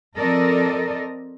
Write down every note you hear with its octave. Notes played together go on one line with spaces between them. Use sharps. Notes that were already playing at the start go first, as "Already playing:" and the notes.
F3 C4 A4 A#4 D5 D#5